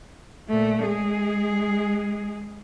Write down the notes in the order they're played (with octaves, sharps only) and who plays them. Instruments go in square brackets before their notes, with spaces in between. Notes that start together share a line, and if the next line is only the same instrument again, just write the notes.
[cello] A#2 A3
G#3 G#4